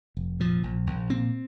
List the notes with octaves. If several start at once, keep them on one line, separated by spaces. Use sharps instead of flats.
F1
A#2 F3
A#1
A#1
A#2 C4